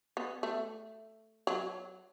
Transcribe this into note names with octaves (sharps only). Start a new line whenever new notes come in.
B3
A3
F#3